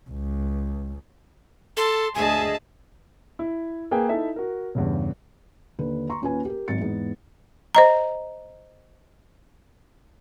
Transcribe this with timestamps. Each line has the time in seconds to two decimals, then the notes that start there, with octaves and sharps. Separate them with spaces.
0.10 C#2
1.77 A4 A5 C6
2.15 D2 G#4 D#5 E5 G#5 A5
3.39 E4
3.91 A#3 G#4 B4 G5 G#5
4.09 D#4 E4 A4 E5
4.36 F#4 A#4
4.75 E2 G2 C#3
5.79 D#2 D3 B4
6.10 A#5 C6 C#6
6.22 D#2 C#4 F4 B4 G#5
6.45 G4 A#4
6.68 G#1 F#3 A6 C#7
6.80 E2 G#2 B3
7.75 C5 D#5 A#5